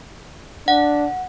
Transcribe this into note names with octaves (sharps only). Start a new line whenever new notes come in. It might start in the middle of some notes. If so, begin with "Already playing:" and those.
D4 F#5